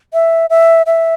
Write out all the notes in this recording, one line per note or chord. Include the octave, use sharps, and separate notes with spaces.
E5
E5
E5